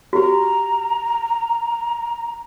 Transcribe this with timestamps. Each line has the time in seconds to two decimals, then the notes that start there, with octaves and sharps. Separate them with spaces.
0.13 F#4 G4 A#5